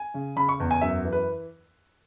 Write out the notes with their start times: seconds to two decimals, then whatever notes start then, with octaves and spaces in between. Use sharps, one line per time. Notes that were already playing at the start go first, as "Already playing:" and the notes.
Already playing: G#5
0.14 C#3
0.36 C#3 B5
0.49 C#6
0.60 E2
0.71 G#5
0.81 F#2 E5
1.05 E3
1.12 B4